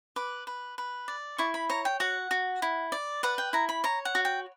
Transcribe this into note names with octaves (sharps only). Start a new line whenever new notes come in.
B4 D6
B4
B4
D5
E4 C#6
B5
C#5 A#5
G5
F#4 F#5
F#4
E4
D5
B4 F#5
G5
E4 A#5
B5
C#5 A#5
F#5
F#4
G5